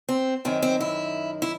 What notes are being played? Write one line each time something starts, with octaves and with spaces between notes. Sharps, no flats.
C4
F#2 D#3 C4
C4
E4
E4